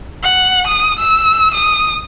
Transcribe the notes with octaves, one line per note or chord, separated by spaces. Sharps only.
F#5
D#6
E6
D#6